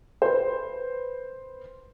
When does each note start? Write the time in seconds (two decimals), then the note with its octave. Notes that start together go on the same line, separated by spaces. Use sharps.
0.22 B4 C5